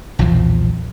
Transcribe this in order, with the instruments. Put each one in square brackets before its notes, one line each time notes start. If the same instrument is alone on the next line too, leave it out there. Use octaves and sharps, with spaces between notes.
[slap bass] B1 E2 A#2 F3